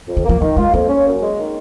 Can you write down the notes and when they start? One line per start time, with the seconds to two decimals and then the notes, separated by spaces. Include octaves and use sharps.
0.08 F2
0.17 D#3
0.25 F3 A#3
0.40 D#3 F3
0.57 G#3 F4
0.74 F2 A#3
0.88 C#4
1.06 F#2
1.21 G#3
1.37 D#3